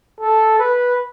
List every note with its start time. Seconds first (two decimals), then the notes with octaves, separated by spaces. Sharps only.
0.20 A4
0.59 B4